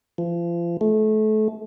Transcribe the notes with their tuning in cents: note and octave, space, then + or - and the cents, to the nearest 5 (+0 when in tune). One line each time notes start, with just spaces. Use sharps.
F3 -35
A3 -30